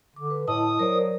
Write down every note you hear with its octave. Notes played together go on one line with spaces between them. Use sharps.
D3 D6
B4
A2 E4 D#5 A5 D#6
F#3 A#4 C5 D5